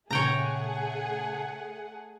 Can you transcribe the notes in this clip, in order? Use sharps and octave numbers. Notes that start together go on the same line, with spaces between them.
A#2 C#3 A3 G#4 C#5 F#5 G5 A#5